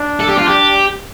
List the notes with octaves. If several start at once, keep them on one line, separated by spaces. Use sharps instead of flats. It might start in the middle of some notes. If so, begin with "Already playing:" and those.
Already playing: D4
A4
G4
F4
G4